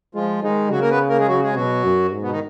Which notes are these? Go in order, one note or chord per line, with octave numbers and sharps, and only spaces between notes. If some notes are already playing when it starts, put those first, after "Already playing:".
F3 G#3 F4
D#3 G#3 D#4
C#3 F#3 F#4
A#3 A#4
B3 B4
A#3 A#4
G#3 G#4
F#3 F#4
G#3 G#4
B2 F#3 F#4
F#2
G#2
B2 B3
D#3 D#4